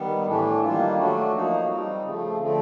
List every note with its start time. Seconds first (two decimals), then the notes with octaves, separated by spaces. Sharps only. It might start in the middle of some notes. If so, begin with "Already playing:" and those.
Already playing: D#3 G3 B3
0.26 A2 E3 A3 D4
0.62 D#3 G3 A#3 D4 F4
0.97 F#3 A3 D4 F#4
1.32 F3 A#3 D#4 F#4
1.68 G3 C4 D#4
2.03 C#3 F3 A3
2.39 D3 F3 A3 C4